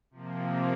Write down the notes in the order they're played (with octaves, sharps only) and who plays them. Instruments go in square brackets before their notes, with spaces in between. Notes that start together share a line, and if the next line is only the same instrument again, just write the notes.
[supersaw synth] C3 F3 A#3